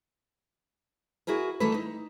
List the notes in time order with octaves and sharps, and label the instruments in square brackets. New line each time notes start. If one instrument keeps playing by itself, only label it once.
[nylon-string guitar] E4 F#4 G#4 A#4 B4
D#3 E3 G3 A3 A4 B4
D#4